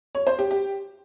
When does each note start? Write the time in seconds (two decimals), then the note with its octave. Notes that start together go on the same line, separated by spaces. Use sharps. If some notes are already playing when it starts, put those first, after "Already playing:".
0.15 C#5
0.27 C5
0.39 G4
0.51 G4